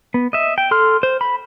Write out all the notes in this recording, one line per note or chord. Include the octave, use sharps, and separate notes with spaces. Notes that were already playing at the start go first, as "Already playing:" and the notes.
B3
D#5 E5
G5
A4 C6 F6
C5
B5